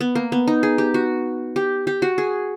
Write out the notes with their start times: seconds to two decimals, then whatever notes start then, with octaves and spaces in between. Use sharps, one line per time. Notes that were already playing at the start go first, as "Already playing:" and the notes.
0.01 B3
0.15 A#3
0.32 B3
0.47 D#4
0.63 G#4
0.78 G4
0.94 F#4
1.56 G4
1.87 G4
2.02 F#4
2.18 G#4